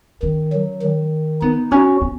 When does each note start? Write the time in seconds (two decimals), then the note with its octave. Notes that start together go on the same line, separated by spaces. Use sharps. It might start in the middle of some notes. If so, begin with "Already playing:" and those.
0.23 D#3 C#4
0.53 F#3
0.82 D#3
1.42 B3 D#4
1.72 C#4 F#4
2.01 B3